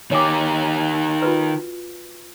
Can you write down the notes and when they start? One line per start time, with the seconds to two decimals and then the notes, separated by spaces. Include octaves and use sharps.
0.11 D#3 G4 C#5 G#5 D6
1.22 F4 F#4 B4